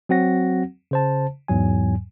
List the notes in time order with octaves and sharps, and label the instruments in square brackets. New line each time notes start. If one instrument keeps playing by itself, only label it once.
[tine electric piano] F#3 C4 F#4 F#5 A#6
C#3 C5 A5
E2 G#2 F#3 G#5